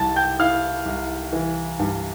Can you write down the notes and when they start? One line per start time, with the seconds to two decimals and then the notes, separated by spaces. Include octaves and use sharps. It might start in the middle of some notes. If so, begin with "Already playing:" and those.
Already playing: C2 E4 A5 A6
0.16 G5 G6
0.39 E4 F5 F6
0.86 C2
1.32 E3
1.79 G2